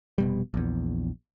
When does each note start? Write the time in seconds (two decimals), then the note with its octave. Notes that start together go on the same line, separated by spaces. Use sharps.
0.18 F1 B2 G3
0.54 A#1 E2